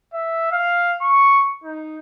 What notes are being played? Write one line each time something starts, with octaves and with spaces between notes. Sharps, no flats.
E5
F5
C#6
D#4